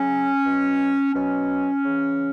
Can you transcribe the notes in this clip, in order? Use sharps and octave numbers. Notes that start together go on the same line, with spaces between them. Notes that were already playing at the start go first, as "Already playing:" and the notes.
Already playing: C#3 F#3 C#4
B2 F#3
B2 F#3 C#4
C#3 E3